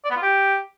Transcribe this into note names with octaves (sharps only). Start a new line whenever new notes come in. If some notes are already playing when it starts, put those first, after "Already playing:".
D5
B3
F4
G4